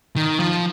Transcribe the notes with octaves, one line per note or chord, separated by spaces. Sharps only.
D#3
F3